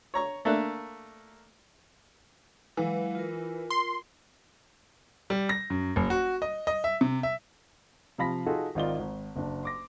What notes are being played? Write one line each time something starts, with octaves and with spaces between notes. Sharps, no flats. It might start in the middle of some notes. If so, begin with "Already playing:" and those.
C#5 A#5 C#6
A3 A#3 D4 E5 F#6
E3 F#3 G#3 F5
F4 A#4
C6
G3
A#6
F#2
F#1
F#4
D#5
D#5
E5
C3
E5
C3 F3 F5 B5 A#6 B6
D#4 F4 F#4 G#4 A4
G#1 D#3 D#4 F4 D5 G7
G#1
F#1 D4
C6 D6 A#6